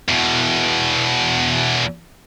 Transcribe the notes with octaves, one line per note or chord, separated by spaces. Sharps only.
E2 B2